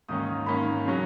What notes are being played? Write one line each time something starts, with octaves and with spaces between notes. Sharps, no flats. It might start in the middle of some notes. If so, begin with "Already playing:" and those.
G#2 D#3 A#3 C#4 D#6
G#2 D#3 A#3 C#4 B5
C#3 F#3 C#4